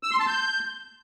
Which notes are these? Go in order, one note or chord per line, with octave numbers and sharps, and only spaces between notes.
E6
C6
A5
G6